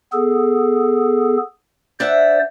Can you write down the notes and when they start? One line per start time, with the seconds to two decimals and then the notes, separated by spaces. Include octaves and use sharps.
0.12 B3 G#4 A4
2.00 D4 C5 D5 E5 F#5